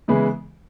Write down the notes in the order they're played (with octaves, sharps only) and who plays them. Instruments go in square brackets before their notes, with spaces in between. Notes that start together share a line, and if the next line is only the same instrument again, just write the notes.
[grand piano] C#3 E3 G#3 B3 E4